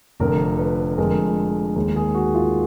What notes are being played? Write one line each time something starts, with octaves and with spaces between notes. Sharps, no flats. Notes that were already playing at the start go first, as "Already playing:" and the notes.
F1 F2 D3 A#4
B4
F2 D3 G#3 A#4
D#2 D#3 G#3 A#4
G#4
F#4
F4